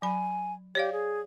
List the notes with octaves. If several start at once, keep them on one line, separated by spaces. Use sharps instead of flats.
F#3 G#5 B5
G4 C#5 D5 F5
G#4